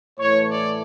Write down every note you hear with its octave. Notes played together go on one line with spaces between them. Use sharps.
A2 E3 A3 C#5
D5